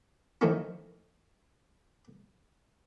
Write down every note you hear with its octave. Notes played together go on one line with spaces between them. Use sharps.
D#3 F3 A3 A#3 C#4 E4